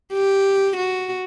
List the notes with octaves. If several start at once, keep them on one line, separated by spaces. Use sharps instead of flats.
G4
F#4